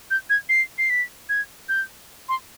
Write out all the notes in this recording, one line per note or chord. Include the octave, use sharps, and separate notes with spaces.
G6
G#6
C7
C7
B6
G#6
G6
C6